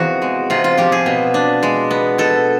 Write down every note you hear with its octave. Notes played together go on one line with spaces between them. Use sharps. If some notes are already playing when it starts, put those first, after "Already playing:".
Already playing: E2 C3 F3 F#4
G#3
C3 F4
F4
F3 G4
G#4
B2
D4
G#3
B3
B2 A4